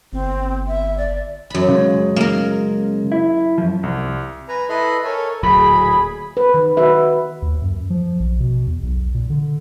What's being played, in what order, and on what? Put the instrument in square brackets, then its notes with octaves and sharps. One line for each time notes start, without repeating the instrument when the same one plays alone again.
[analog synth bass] G1 [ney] C4
[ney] E5
D5
[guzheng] F#2 B5
[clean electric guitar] C#3 G#3
[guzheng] A#3 A#4
[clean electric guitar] E4
F#2 F3
[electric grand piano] C2
[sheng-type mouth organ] B4 G#5 A#5
E4 A4 B4 D#5 B5 C6
A4 A#4 C#5 G#5
[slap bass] D1 A#2 F#3 [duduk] G#4 [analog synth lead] B5
[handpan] B4
D#3
F#4 B4 E5
[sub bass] D#2
F#2
F3
A#1
B2
E2
B1
A#2
D3